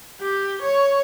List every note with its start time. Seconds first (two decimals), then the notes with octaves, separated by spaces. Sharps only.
0.21 G4
0.62 C#5